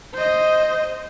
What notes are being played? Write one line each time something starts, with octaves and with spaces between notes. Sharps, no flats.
C5 D#5